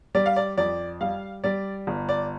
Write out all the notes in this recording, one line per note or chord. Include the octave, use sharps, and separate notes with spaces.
G3 D5
F5
D5
F2 D5
G3 F5
G3 D5
G1
D5